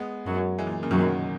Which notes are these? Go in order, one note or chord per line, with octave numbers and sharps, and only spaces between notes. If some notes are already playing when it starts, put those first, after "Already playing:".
Already playing: G#3 B3
F#2 F#3
E3 G#3
A#2
A#2 C#3
F#2 B2 D#3 F#3